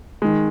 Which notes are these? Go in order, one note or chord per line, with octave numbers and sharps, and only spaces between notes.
D#3 G#3